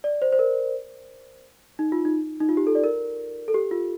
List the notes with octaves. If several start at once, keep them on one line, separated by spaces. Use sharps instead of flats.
D5
C5
C5
A#4
D#4
F4
D#4
D#4
F4
G4
A4
D5
A#4
A4
G4
F4